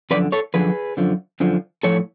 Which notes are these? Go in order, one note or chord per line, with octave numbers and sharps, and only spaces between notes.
F#2 D3 F3 B4 D5
A4 C#5
F#2 D3 F3 G#4 B4
F#2 D3 F3
F#2 D3 F3
A2 F3 A4 C#5